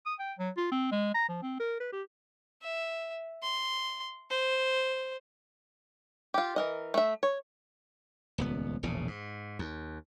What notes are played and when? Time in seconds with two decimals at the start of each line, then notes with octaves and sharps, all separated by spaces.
0.06 D#6
0.19 G5
0.38 F#3
0.57 F4
0.72 C4
0.92 G#3
1.14 A#5
1.29 F3
1.42 C4
1.60 A#4
1.80 B4
1.92 G4
2.62 E5
3.42 C6
4.30 C5
6.34 F4 G4
6.56 E3 A#4 D#5
6.94 A3 E5
7.23 C#5
8.38 D#1 C#2 B3
8.83 E1 A#1 E2 C#3
9.08 G#2
9.59 D#2